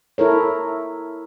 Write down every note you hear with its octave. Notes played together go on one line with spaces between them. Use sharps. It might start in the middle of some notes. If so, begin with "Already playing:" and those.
E4 A4 A#4 C#5